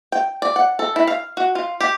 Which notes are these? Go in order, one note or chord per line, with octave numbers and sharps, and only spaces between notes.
G5
D5
F#5
A4
E4
F5
F#4
F4
G4